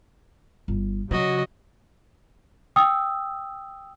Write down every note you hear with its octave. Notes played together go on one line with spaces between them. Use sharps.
G1
C#3 F#3 F#4 D#5
G5 D#6 E6